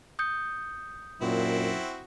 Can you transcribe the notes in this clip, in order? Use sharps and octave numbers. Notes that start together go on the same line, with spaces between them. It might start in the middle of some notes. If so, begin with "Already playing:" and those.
D#6 G6 C#7
F#2 A#2 C4 E4 F#4